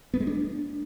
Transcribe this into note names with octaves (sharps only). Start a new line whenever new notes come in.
B3
G#3
D4